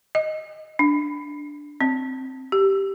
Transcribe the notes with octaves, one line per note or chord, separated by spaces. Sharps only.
D#5
D4
C4
G4